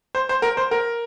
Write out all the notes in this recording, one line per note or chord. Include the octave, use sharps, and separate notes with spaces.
C5
C5
A#4
C5
A#4